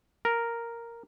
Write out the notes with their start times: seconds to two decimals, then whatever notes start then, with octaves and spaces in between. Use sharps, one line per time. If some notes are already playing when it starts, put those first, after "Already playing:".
0.25 A#4